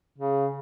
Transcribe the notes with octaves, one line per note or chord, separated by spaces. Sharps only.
C#3